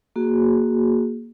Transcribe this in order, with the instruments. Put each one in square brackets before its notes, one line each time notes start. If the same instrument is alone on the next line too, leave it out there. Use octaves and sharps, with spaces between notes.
[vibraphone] A#3 F#4 G#4